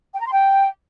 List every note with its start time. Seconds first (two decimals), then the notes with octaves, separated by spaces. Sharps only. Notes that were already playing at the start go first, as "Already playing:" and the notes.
0.14 G5
0.20 A#5
0.26 C6
0.32 G5